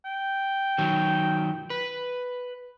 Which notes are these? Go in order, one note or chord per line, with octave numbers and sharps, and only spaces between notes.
G5
D#3 F#3
B4